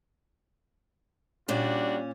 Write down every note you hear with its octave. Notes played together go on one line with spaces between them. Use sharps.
A#2 G3 C#4 D4 F#4